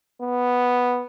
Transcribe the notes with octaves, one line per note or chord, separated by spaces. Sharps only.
B3